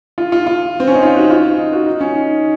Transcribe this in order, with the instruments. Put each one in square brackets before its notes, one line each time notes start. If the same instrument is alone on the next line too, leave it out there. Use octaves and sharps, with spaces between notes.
[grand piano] F4
F4
F4
C4
C#4
D#4
F4
F#4
F4
D#4
F#4
D#4
C#4
D#4